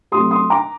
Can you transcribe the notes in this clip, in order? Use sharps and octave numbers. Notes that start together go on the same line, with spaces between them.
C3 F#3 A3 C6 D#6
C6 D#6
A#5 D6